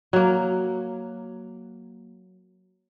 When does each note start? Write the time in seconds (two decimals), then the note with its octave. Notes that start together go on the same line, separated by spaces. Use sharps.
0.13 F#3 A#3